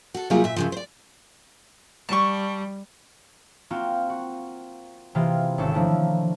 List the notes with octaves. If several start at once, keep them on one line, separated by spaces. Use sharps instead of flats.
F#4 A4
C3 F#3 G3 A#3 F4 G#4
A#2 E5
F#2 C#3 F3
C5 D5
G3 A5 C#6
A#3 C4 F4 F#4
F#4
C3 E3 A#3 F4 G#4
G#1 C#3 C#4 A4 E7
D#3 F3 A3 A#3 D4 E4